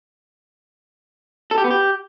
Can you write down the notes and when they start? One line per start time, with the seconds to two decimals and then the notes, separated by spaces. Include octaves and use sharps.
1.51 A4
1.58 G4
1.64 B3
1.71 G4